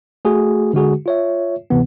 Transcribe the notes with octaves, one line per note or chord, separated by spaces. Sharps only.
A3 F#4 G#4
D3 G#3 F#4 G#4
F4 C#5 E5
D2 C3 E3 B3